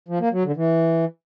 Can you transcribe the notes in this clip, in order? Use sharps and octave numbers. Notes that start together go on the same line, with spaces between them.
F3
A#3
F#3
D3
E3